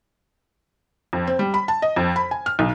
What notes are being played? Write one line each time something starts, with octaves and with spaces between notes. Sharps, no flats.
F2
C4
G3
B5
A5
D#5
F2
B5
G#5
F6
B1